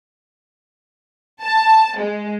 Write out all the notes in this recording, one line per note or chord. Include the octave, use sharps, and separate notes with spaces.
A5
G#3